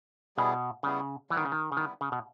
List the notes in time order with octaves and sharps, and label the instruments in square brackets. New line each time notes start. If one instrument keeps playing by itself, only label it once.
[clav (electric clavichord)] B2 [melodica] G3 B3 E4 G#4
[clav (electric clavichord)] C#3 [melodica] G3 B3 E4 G#4
[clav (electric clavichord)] E3 [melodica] G3 B3 E4
[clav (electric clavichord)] D#3
C#3
D#3
C#3
[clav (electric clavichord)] D#3 [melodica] G3 B3 E4
[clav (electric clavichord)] C#3
B2